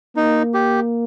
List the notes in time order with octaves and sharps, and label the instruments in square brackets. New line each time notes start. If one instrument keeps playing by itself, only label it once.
[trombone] A#3 [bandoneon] D#4
[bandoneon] G4